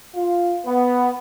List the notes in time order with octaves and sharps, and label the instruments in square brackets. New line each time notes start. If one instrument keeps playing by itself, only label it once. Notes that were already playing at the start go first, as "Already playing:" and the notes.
[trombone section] F4
B3